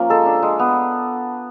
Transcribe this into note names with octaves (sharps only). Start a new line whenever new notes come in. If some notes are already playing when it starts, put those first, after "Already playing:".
Already playing: F3 A#3 C#4
G#3 A4
D4
G#3
B3